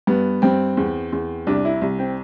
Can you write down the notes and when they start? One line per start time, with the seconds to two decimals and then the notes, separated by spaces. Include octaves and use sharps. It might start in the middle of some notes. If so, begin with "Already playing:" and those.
0.07 G2 B3
0.42 G2 C4
0.77 E2
1.12 E2
1.47 C2 D4
1.65 E4
1.82 C2
1.99 C4